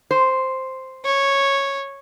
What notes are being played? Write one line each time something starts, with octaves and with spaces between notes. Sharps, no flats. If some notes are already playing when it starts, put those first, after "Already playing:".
C5
C#5